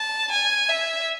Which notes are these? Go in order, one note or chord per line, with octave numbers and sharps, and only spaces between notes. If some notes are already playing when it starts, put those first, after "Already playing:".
Already playing: A5
G#5
E5